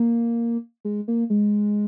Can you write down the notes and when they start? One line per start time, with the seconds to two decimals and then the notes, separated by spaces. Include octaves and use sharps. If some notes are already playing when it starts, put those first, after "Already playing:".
Already playing: A#3
0.85 G#3
1.08 A#3
1.30 G#3